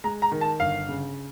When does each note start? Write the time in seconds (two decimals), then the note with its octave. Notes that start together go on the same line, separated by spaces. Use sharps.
0.04 G#3 A#5
0.22 A#5
0.32 D#3
0.41 A5
0.60 G1 F5
0.89 C#3